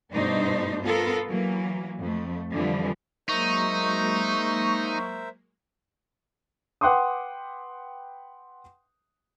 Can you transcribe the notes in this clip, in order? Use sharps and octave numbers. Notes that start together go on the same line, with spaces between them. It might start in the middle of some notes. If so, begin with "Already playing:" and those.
G2 B2 A3 D4 D#4 C5
B3 F4 A4 A#4
E3 F#3 A#3
F2 A3
F2 D3 E3 F3 G3
F#3 G#3 A#3 D#4 A#4 C5 E5 C#6
B4 F#5 G5 C6 D6 D#6